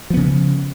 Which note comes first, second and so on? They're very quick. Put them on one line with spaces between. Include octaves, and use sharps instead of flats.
F3 B3 C#3